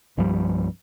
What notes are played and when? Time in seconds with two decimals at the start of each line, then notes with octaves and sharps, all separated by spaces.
0.17 C2 G2 F3 G3